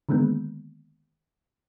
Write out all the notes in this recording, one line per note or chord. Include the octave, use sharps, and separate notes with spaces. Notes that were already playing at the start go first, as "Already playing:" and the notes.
D3 D#3 G#3 A#3 B3